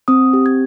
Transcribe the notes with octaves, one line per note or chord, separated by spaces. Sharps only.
C4 D#6
G4
G#6